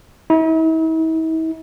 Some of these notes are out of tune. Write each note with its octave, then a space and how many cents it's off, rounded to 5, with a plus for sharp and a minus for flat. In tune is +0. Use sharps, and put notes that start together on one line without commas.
E4 -45